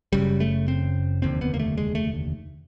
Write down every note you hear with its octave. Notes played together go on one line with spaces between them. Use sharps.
F#1 F#2 C#3 G3
A3
C4
F1 D#2 D3 C4
B3
A#3
A3
G#3
A3